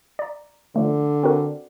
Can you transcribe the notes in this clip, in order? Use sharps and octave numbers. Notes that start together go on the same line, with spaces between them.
D5 A#5
D3 F3 A3
C4 F#4 A#4